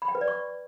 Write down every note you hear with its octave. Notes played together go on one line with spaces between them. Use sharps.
B5
G5
B4
D5
C#6